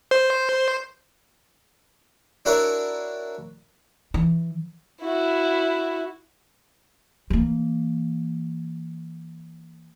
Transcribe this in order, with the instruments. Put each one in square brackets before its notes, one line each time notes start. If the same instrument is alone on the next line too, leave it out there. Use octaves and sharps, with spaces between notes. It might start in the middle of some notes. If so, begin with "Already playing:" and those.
[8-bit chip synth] C5
[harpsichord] D4 E4 F#4 A#4 C#5 E5
[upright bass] E3
[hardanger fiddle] E4 F#4
[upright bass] E3 A#3